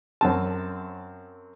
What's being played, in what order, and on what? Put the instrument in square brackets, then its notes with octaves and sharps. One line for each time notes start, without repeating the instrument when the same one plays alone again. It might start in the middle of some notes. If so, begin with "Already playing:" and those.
[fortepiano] F#2 C4 A5